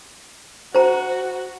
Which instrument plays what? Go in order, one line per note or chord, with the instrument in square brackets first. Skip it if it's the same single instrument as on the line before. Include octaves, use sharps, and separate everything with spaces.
[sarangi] F#4 [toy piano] C5 A#5